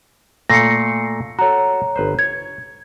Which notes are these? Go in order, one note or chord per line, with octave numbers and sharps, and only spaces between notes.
A#2 A3 A#6 C7 C#7
F#4 A4 C#5 A#5
G1 B4 C5
C#5 G#6